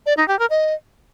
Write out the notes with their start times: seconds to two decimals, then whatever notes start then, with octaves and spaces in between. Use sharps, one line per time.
0.06 D5
0.17 D#4
0.28 G4
0.39 A#4
0.50 D#5